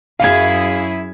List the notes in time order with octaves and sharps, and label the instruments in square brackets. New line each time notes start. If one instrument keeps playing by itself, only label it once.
[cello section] F#2 E4 G#4 [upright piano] F5 G#6